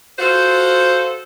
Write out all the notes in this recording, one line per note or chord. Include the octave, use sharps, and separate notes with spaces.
F4 F#4 A4 C5